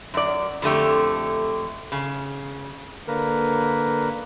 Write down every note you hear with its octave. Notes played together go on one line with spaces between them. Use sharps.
F#2 D5
F2 D3 A3 G4
C#3
D3 A#3 A#4 B4